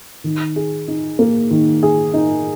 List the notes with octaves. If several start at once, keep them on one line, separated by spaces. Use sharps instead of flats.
D#3
G#4
D#4
A#3
D#3
G#4
D#4